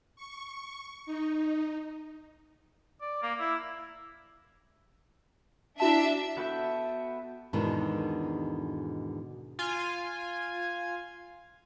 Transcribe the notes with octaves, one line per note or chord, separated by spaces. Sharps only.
C#6
D#4
D5
A#3
E4
D4 E4 F#4 E5 A5
B3 F#4 A4 E5 G5
E2 G#2 B2 D3 D#3
F4 G#5